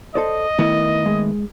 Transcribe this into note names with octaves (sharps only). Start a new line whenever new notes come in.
A4 C5 D5 D#5
D#3 A3 B3 E4
G#3